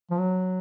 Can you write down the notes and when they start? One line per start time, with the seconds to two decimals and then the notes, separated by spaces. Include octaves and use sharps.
0.10 F3
0.19 F#3